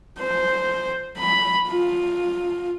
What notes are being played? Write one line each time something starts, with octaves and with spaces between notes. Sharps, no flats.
C5
B5
F4